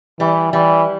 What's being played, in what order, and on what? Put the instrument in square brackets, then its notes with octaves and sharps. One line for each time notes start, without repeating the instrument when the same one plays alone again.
[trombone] E3 [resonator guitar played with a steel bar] G3
[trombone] E3 [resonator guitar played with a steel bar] G3